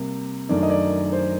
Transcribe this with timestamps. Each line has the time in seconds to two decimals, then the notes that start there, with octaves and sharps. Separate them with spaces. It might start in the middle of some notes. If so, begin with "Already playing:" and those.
Already playing: C3 G3 A#3
0.49 F#2 D#3 A3 D4 D5
0.63 D#5
0.70 D5
1.12 C5